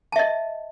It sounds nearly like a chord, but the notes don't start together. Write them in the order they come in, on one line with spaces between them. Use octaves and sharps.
A5 E5 D#5